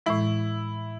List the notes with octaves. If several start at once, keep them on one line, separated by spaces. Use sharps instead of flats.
A2 E3 G#3 E4